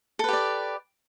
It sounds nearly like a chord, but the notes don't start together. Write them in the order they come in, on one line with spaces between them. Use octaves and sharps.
A4 B4 G4 D5